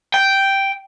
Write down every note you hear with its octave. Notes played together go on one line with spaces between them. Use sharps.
G5